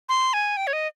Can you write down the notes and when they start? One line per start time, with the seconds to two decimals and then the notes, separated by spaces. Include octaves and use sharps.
0.09 C6
0.33 G#5
0.57 G5
0.67 C#5
0.73 D#5